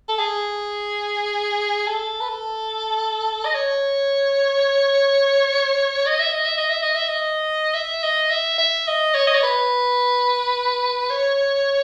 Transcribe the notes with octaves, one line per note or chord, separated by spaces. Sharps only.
A4
G#4
A4
B4
A4
D#5
C#5
D#5
E5
D#5
E5
D#5
E5
D#5
E5
D#5
E5
D#5
E5
E5
D#5
C#5
D#5
C#5
B4
C#5